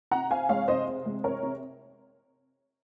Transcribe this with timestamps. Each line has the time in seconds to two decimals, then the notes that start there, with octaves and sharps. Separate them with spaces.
0.11 C3 F#5 A#5
0.30 C4 F5 G#5
0.49 G#3 C#5 F5
0.68 C3 C5 D#5
0.87 C4
1.06 G#3
1.24 C3 A#4 C#5
1.43 C3